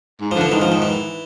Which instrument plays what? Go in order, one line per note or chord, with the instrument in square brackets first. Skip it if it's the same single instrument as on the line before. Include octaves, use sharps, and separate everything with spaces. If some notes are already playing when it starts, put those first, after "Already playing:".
[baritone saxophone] G#2
[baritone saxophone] D3 [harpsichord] F3
[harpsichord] E3
[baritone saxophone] G#2 [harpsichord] D#3
[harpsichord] F3
D#3
E3